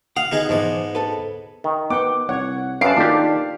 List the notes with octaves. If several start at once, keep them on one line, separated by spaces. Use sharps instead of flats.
F5 F#5 D#6
B3 D#4 G#4
G#2 E3 F3 B3 G#4 C5 D#5
A4 B4
D#3
B3 F#5 G5 D6
C2 C#5 F#5
F#2 C#4 B4 F5 A5 C7 D7
D#3 A#3 D4 F4 G4 A4